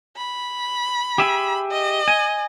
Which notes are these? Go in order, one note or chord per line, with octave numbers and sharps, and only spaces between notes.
B5
G4 G#4 E5
D#5
G#5